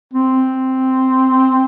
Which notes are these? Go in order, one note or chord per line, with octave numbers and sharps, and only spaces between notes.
C4